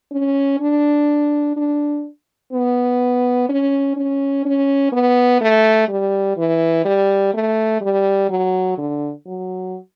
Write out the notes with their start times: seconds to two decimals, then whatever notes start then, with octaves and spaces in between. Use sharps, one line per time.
0.12 C#4
0.60 D4
1.57 D4
2.53 B3
3.49 C#4
3.97 C#4
4.45 C#4
4.92 B3
5.41 A3
5.88 G3
6.37 E3
6.85 G3
7.34 A3
7.81 G3
8.30 F#3
8.78 D3
9.26 F#3